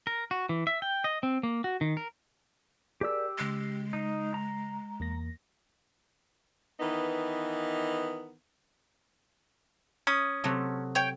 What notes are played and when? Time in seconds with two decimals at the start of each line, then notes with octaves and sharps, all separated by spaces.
0.07 A#4
0.31 F#4
0.49 E3
0.67 E5
0.82 G5
1.04 D#5
1.23 C4
1.43 A#3
1.64 F#4
1.81 D#3
1.97 A#4
3.01 G4 G#4 A#4 D5 E6
3.38 C#3 G#3 C7
3.93 D#4
4.34 A#5
5.00 E2 A#3 A#6
6.80 D#3 E3 B3 D#4
10.07 C#4 D#6
10.44 C3 F#3 A3
10.95 C#5 G5